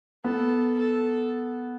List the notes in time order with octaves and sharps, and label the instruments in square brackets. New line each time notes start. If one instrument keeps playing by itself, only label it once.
[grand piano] B3 [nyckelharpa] A4
[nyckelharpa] A4